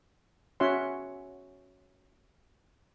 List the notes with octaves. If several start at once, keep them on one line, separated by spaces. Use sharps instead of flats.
C#4 F#4 C#5 E5 F#5 C6